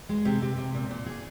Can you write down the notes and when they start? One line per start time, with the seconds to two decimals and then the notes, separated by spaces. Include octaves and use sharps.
0.09 G#3
0.25 C3
0.42 C3
0.58 C3
0.75 A#2
0.91 A#2
1.06 G#4